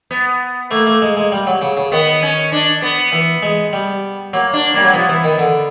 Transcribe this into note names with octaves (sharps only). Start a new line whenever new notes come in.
B3
A3 A#3
A3
G#3
G#3
G3
F#3
C#3
C#3
D#3 B3
C#4
D4
B3
E3
G#3
G3
F#3 A#3
D4
G3 A#3
F#3
F3 B3
E3
D#3
D3